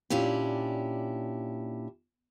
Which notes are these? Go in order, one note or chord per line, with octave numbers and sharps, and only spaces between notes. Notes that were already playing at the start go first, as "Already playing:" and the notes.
A#2 C#4 D4 E4 G4